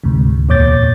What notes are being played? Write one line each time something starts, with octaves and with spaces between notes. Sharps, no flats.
D2 G#2 C3
E2 A#2 C#5 D6 G6 A6